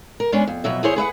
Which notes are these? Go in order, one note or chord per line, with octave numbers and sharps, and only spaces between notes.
A#4
G#3 B3 C#4 D4
F2
F2 B2 F#3 E5
E2 E4 G#4 C5 C#5
G#4 B4 E5 F#5